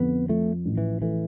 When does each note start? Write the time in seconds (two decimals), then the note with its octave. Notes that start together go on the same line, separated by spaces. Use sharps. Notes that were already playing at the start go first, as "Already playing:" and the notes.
Already playing: F2 D3 B3
0.29 F3 A3
0.66 A1
0.78 E3
1.01 E3 A3